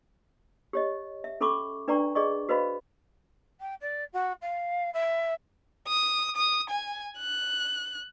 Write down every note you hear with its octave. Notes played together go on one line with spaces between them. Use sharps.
G4 C#5 D#5
E5
C#4 A4 B5 C#6 D6
D4 B4 D5 G5 A#5 C#6
G#4 D5 D#5 C#6
F#4 B4 C5 D#5 F5 B5
G5
D5
F#4
F5
E5
D#6
D#6
G#5
F#6